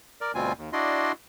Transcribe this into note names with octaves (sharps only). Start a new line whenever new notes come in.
A#4 D5
D2 B2 G3 C4 F4 G#5
D#2
D4 E4 F#4 D5 D#5 C6